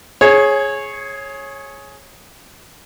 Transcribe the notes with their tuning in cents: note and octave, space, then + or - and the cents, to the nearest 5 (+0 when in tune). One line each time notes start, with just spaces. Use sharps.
G#4 +10 C#5 -15